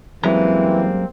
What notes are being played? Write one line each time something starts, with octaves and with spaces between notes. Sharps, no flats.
F#2 E3 G3 G#3 A#3 C4 A#5